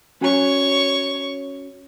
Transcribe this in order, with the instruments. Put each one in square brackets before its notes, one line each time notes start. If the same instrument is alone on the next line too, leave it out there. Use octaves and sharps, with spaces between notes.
[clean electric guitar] C#4 F#4 G#5 [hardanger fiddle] C#5 C#6